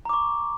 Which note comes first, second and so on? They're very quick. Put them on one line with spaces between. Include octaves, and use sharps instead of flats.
A#5 D6 C#6